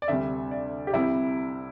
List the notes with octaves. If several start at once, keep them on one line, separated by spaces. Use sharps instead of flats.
D5
D2 C3 G3 E5
D5
G4
C2 C3 G3 E4